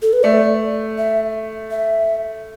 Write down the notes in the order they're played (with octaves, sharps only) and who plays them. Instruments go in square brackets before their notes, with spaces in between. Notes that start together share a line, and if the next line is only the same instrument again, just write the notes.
[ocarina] A4
B4
[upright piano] A3 [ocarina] D5
[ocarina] E5
E5